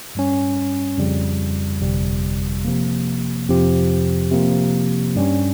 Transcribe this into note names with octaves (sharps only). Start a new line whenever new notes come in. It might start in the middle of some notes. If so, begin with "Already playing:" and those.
G2 G3 C#4
F2 C#3 G3
G1 F2 C3 G3
C3 F3 A#3
F2 C3 F3 C4 G4
C3 F3 A#3
G2 G3 C#4